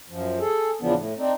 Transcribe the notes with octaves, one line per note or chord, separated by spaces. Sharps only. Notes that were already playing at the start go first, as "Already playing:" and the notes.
F#2 F3
G#4 A4
E2 C#3 E3 F3 B3 D4
A2
C4 D4 D#4